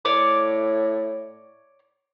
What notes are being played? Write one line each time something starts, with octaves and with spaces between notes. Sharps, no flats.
A2 C#5 D5 D6